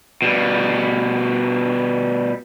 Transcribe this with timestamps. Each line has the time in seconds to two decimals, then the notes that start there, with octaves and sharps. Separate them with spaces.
0.22 B2 G3